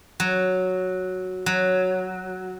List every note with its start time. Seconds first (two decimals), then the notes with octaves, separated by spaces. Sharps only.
0.20 F#3
1.46 F#3